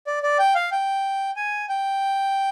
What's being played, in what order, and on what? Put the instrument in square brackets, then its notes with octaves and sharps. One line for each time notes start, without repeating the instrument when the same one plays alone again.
[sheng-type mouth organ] D5
D5
G5
F5
G5
G#5
G5